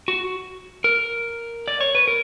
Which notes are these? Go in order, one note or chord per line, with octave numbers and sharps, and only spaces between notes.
F#4
A#4
D5
C#5
B4
A#4